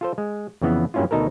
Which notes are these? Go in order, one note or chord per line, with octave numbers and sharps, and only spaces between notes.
F4 A4 C5
G#3
F2 C#3 E3 B3
G2 F#3 A#3 C#4 E4 F4
D2 B2 D#4 A4 A#4